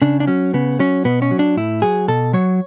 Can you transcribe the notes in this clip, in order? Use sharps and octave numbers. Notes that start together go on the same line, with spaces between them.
C#3 D4
D4
F#3 C#4
C#3 B3
F#3 C#4
B2 B3
C#4
F#3
D4
A2 E4
F#3 G#4
B2 A4
F#3 C#5